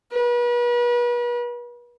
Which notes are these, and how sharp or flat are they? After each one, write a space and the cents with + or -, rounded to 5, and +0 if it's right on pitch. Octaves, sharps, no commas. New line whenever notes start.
B4 -40